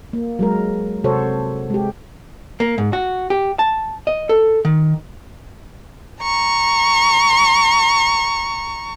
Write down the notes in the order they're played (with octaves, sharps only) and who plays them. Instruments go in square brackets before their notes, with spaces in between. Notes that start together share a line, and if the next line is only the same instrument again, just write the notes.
[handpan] A#3
F#3 G#3 A#4
C3 F#4 A4 C5 C#5
G#3 G4
[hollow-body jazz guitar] A#3
G#2
F#4
G4
A5
D#5
A4
D#3
[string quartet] A#5 C#6